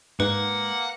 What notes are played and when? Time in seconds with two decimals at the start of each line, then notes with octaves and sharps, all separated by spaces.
0.20 G#2 A#3 B4 F#5